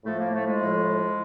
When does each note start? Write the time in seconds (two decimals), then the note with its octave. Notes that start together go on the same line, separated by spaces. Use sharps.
0.04 A2 F3 A3
0.18 A#3
0.33 A3
0.46 G#3
0.60 A2 F3